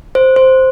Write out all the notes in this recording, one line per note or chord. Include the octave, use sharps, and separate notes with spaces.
C5
C5